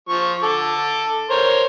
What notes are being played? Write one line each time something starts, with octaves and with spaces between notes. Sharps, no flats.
F3 C#6
A4 D6
A#4 C5 C#5